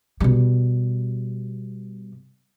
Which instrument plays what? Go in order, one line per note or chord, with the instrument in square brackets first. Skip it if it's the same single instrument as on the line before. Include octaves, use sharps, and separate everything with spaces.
[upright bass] B2 G3